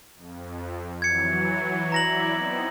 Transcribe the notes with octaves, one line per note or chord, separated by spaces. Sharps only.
F2
E3 F#3 G#6 C#7
E4 D5 E5 A#5 A#6 F#7
B3 C4 D#4